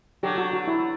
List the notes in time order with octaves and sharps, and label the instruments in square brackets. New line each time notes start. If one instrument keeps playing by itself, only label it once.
[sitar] D3 F#3 [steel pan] G4
[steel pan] F#4
F#4
E4